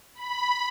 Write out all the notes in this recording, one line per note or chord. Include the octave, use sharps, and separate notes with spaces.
B5